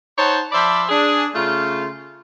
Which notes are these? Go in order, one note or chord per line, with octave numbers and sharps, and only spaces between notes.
D#4 C5 C#5 F#5 A5
F3 C5 D5 E5 B5
D4 G#4
C#3 A3 F4